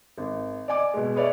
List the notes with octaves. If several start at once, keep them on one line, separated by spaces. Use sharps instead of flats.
G#1
D5 D#5 G#5 D6
B2 G#3
G#4 B4 C#5 D5 E5